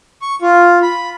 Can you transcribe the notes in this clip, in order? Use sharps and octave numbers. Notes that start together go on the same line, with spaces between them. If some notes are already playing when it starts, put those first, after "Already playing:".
C#6
F4
B5